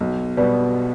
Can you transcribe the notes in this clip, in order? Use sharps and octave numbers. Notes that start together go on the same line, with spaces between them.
B1
B2 G3 B3